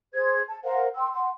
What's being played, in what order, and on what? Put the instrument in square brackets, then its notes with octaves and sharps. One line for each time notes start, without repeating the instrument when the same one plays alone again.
[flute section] G#4 C5 G#6
A5
A#4 C5 F5 F#5
G5 C6 E6
F#5 C6